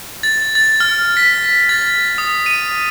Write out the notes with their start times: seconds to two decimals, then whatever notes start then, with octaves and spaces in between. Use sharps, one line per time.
0.23 A6
0.55 A6
0.80 F6
1.17 B6
1.69 A6
2.18 D#6
2.46 D#7